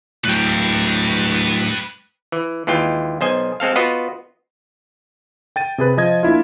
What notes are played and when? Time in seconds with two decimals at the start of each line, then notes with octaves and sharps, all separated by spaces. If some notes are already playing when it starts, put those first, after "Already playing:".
0.25 A2 F#3 B4 G5
2.32 E3
2.67 D#2 E3 G#3 F4 G5
3.21 B1 C5 D#5 G#5
3.60 G#3 C4 A4 F5
3.76 B3 F4 F#4 B4 D#5
5.56 G5 A6 D#7
5.78 C3 G#4 B4
5.97 F3 D#5 G#6
6.23 A#3 D4 E4 F4